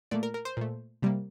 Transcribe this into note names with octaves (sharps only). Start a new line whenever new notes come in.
A#2 A3 D5
A#4
A#4
C5
A#2 A3
C3 G3 A#3